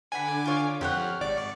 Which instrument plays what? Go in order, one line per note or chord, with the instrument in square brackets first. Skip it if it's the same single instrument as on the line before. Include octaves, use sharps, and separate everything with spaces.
[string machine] D3 D6 [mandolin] D4 F#5 B5 [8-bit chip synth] G#5
[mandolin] F4 C#5
[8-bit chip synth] F2 [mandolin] G4 C#5 F#5 [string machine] F6
[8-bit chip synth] G#1 D5 [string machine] C#6